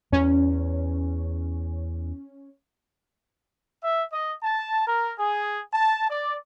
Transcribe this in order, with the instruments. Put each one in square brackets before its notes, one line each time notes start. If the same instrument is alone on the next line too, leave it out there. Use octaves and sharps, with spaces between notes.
[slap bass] E2 [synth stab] C#4
[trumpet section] E5
D#5
A5
A#4
G#4
A5
D5